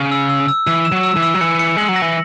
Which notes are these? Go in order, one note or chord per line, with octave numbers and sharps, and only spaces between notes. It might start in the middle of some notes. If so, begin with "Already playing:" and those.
Already playing: C#3
E6
E6
E6
E3 E6
E7
F#3
E6
E3
E6
F#3
E3 C#7
C#7
G#3 F#7
F#3
A#6
E3